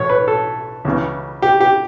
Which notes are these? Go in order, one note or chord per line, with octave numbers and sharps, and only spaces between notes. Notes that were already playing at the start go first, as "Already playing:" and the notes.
Already playing: B1 A2 E3 C#5
B4
A4
C#2 C#3 E3
G4
G4